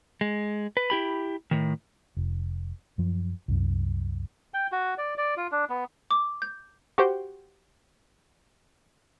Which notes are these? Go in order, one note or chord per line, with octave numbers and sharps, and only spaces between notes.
G#3
B4
E4 G4 B5
A2 D#3
F1
F#2 F3
C2 F#2
G5
F#4
D5
D5
F4
D4
B3
D6
G6
F#4 G4 C5 G5